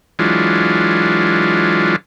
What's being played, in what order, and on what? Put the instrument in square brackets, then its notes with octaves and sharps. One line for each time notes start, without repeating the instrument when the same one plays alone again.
[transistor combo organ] E3 F#3 G#3 D4 F4